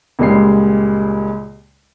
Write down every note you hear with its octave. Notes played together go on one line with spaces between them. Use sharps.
C#2 A#2 G3 G#3 C7